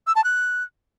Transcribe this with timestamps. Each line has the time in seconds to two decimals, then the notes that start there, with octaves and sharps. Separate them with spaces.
0.07 E6
0.16 A5
0.24 F#6